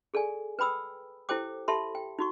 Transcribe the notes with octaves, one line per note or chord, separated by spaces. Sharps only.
G#4 A4 D5 G#5
B4 G5 B5 D#6 E6
E4 G4 A4 C5 G5 D6
G4 A4 E5 A5 B5 C6
G5
D#4 F#4 C#6